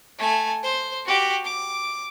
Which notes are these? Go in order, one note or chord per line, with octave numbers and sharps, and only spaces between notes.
A3 G#5
C5
F#4 G4
D6